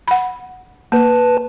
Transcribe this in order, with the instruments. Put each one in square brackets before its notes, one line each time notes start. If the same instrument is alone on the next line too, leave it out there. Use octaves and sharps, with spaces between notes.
[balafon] F#5 B5
[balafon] A#3 [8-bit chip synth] B4 A5